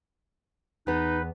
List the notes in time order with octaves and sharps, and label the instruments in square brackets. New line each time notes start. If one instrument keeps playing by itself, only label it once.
[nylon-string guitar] E2 B3 [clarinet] D#4 [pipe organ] B4